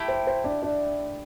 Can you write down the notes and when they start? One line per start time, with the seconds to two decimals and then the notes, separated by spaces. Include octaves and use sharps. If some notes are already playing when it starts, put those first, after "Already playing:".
Already playing: A3 E4 G4
0.08 C5
0.27 C5
0.44 D4 D5
0.63 D4 D5